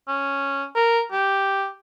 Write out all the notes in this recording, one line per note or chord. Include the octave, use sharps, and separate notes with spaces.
C#4
A#4
G4